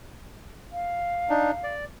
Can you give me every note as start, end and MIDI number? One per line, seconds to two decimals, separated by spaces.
0.72 1.73 77
1.29 1.51 62
1.29 1.51 63
1.64 1.85 74